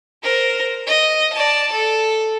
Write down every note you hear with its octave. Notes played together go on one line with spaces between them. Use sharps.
A#4 C5
D#5
D5 A5
A4